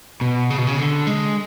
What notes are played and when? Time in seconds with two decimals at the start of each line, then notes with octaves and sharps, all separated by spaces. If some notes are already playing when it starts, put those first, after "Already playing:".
0.21 B2
0.50 C#3
0.58 B2
0.67 C#3
0.78 D3
1.07 G#3